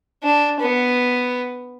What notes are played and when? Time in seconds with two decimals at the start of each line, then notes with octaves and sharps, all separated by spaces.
0.23 D4
0.60 B3